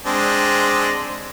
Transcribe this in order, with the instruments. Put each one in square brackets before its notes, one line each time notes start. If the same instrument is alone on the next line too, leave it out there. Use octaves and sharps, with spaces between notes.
[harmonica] G#3 C4 D4